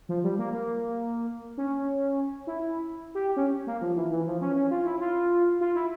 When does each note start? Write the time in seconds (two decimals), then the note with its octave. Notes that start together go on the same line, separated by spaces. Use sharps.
0.09 F3
0.24 G3
0.39 A#3
0.53 A#3
1.58 C#4
2.47 E4
3.15 G4
3.37 C#4
3.67 A#3
3.81 F3
3.96 E3
4.11 E3
4.27 F3
4.41 C#4
4.56 C#4
4.71 F4
4.86 E4
5.01 F4
5.61 F4
5.75 E4